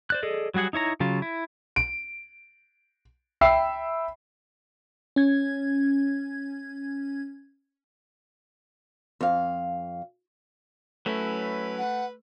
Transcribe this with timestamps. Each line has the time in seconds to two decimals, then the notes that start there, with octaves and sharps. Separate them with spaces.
0.10 C5 D5 F#6
0.23 G#4 A4 D5 D#5
0.54 F#3 G3 F#4 G#4 F#5
0.73 D#4 E4 C#5 A#5
1.00 C#3 F#3 F4
1.22 E4
1.76 D7
3.41 E5 G5 B5 E6 C7
5.16 C#4 G#6
9.21 F2 F5
11.06 F#3 A3 C#4 E4 B4
11.78 F#5